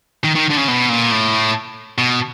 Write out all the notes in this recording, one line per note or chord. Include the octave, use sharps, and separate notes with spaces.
D#3
D#3
D3
C#3
B2
A#2
A2
B2